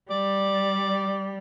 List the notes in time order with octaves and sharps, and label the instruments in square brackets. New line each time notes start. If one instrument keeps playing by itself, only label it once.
[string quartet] G3 [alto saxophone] D5